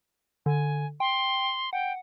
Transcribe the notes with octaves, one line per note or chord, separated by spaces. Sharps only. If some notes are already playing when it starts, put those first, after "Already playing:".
D3 G#5
G5 C6
F#5 G5